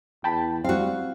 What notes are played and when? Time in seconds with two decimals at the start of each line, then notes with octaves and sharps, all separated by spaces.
0.24 E2 G5 A5 B5
0.64 G3 C4 F#4 F5